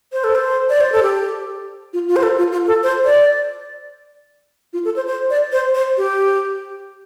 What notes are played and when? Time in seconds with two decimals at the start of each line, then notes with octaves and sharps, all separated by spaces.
0.13 C5
0.24 A4
0.35 C5
0.69 D5
0.81 C5
0.92 A4
1.03 G4
1.93 F4
2.08 F4
2.16 C5
2.23 A4
2.38 F4
2.52 F4
2.67 A4
2.83 C5
3.05 D5
4.73 F4
4.85 A4
4.96 C5
5.07 C5
5.30 D5
5.52 C5
5.75 C5
5.97 G4